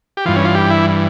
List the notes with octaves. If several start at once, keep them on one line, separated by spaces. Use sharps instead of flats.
G4
G2 E3 F4
C#4
F4
G4
E4